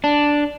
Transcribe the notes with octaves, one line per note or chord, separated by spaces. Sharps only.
D4